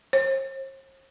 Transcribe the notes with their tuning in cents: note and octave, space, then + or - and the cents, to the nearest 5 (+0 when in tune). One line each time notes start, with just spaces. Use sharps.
C5 +45